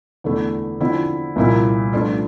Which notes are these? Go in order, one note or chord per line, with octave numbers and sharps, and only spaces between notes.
E2 D3 A3 E4
D3 F3 C4 E4
C2 A#2 F3 A#3 E4
G2 F3 A3 D4 F4